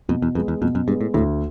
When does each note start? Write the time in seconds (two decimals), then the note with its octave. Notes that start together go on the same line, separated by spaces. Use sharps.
0.09 F2 B2
0.22 E2
0.35 F2 G#3 B3
0.48 E2
0.62 F2 B2
0.75 F#2
0.87 G2 G#3 B3
1.01 A2
1.14 D2 A2